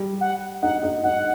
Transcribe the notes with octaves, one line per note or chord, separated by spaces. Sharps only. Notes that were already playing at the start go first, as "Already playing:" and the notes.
Already playing: G3
F#5
D#4 F#5
D#4
D#4 F#5